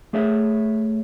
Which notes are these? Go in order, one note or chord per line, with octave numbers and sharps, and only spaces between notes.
A3 G#4 C#5 E5